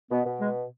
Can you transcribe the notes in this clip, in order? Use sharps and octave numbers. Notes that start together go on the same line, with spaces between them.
B2 B3
B2
G#3